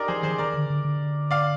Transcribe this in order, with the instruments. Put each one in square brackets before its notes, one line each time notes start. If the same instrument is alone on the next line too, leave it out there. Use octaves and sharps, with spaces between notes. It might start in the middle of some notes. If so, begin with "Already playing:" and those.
Already playing: [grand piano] D#4 G4 A#4 D5
[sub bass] F3 [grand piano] G#4 C5
[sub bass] D#3 [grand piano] G#4 C5
[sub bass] D#3 [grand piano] A#4 D5
[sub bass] D3
D3
D3
[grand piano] D5 F5